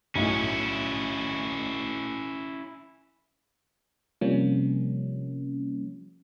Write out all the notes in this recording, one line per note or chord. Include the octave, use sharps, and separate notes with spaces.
B1 A2 C#4 E4
C3 F3 G3 A#3 C#4